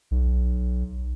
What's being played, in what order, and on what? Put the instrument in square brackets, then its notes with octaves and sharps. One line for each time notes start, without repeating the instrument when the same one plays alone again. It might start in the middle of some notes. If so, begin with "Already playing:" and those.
[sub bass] B1